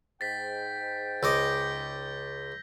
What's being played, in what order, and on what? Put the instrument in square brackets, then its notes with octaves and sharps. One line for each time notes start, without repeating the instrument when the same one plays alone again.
[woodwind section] G#2 G5 [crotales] A6 B6
[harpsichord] C#2 D#5 D6 [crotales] E6 G6 A#6